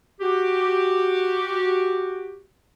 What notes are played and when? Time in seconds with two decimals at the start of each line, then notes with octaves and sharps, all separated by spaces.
0.21 F#4 G4